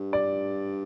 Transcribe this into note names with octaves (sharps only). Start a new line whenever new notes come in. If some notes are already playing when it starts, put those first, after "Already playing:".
Already playing: G2
D5